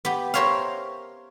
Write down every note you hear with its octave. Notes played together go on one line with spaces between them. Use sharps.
B3 G4
A#4 C5 C#5 E5 F5